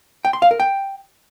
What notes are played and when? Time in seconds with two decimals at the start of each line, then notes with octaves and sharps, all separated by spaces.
0.25 G5
0.33 C6
0.42 F5
0.51 A#4
0.60 G5